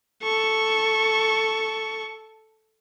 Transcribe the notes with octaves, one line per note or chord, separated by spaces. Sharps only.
A4 C#6